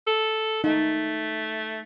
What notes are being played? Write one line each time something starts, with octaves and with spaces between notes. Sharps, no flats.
A4
A3 D#4